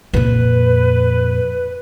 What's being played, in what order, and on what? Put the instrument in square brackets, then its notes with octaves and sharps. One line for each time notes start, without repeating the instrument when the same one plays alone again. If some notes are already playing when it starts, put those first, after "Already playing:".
[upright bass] F2 A#2 [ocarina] B4